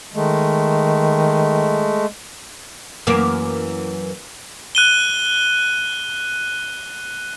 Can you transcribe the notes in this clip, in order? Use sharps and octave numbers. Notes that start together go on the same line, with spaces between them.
D#3 G#3 A3
F#2 E3 A#3
F#6 D#7 G7